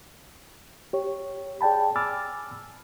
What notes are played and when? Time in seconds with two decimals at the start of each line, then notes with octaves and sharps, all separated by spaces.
0.93 G4 C#5
1.61 G#4 D5 G5 A5 B5
1.96 G#5 B5 D6 E6 F6 A6